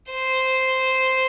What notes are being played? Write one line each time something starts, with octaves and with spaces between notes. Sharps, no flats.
C5